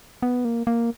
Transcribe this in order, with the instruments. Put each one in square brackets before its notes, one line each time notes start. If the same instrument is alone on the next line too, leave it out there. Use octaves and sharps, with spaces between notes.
[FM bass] B3
A#3
A#3